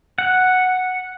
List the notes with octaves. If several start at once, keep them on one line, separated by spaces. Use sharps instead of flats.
F#5